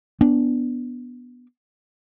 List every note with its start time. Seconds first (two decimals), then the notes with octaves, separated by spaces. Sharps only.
0.21 B3 D4